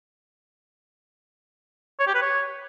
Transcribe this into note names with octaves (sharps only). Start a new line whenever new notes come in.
C#5
G4
B4
C#5